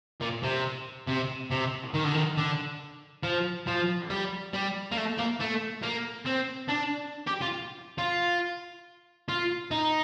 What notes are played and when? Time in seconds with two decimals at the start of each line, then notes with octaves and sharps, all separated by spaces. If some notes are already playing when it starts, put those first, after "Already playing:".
0.21 A#2
0.43 C3
1.07 C3
1.51 C3
1.94 D#3
2.04 D3
2.14 D#3
2.37 D3
3.23 F3
3.67 F3
4.10 G3
4.53 G3
4.91 A#3
4.97 A3
5.18 A#3
5.40 A3
5.83 A#3
6.26 C4
6.69 D4
7.27 G4
7.41 F4
7.98 F4
9.29 F4
9.71 D#4